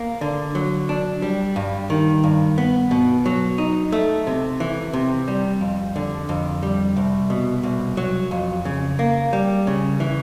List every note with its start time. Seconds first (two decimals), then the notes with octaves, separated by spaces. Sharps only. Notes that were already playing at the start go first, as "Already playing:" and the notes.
Already playing: A#3
0.21 D3
0.55 F#3
0.89 D4
1.22 G3
1.56 G2
1.90 D#3
2.24 G2
2.58 B3
2.91 B2
3.26 F#3
3.58 D#4
3.92 A3
4.27 C3
4.60 E3
4.93 C3
5.28 G3
5.61 F2
5.96 D3
6.29 F2
6.63 G3
6.97 C2
7.30 B2
7.63 C2
7.97 F#3
8.31 F2
8.65 C#3
8.99 A#3
9.33 G3
9.67 C#3
10.00 E3